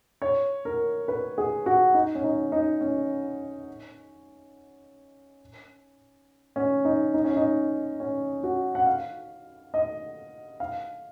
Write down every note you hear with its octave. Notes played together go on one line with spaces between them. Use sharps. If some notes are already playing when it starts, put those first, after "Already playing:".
C#5
A#4
B4
G#4
F#4
D#4
C#4
D#4
D#4
C#4
C#4
D#4
D#4
C#4
D#4
C#4
F#4
F#5
F5
D#5
F5